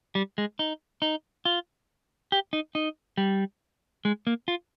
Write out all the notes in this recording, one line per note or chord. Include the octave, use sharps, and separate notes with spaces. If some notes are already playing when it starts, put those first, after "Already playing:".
G3
G#3
D#4
D#4
F4
G4
D#4
D#4
G3
G#3
A#3
F4